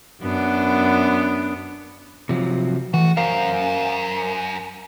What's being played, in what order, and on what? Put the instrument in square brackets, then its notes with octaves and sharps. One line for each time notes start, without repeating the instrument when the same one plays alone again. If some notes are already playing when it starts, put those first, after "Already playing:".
[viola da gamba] F#2 B3 D4
[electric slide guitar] C3 F3 F#3
[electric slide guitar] E3 A3 [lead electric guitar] F#4
[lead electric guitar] F#2 [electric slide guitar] A#4 C5 F5